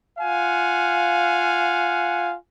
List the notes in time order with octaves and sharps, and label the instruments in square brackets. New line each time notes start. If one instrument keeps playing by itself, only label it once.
[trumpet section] F4 F5 F#5 G#5